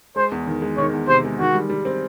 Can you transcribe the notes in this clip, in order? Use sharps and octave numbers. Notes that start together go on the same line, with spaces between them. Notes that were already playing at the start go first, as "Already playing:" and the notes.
G#3 C5
E2
D#3
G#3
D#3 C#5
E2
C3 C5
G#3
D#3 F#4
G3
G3
C4